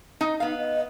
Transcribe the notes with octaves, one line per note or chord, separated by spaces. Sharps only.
D#4
B3 D#4 F5
D#5